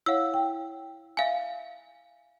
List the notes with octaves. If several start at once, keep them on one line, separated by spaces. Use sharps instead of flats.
E4 C#5 F5 F#5 E6
G5
E5 F5 G#5